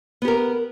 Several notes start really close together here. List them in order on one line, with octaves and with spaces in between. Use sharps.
B3 G4 A#4